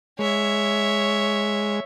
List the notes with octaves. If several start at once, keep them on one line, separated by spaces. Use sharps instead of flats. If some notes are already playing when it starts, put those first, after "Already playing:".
G#3 C#5 E5